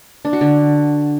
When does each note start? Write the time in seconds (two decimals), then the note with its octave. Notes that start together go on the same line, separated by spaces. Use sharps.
0.25 D4
0.33 F#4
0.41 D3